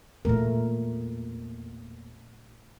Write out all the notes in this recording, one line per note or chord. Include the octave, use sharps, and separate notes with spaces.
E2 A#2 A3 A#3 A#4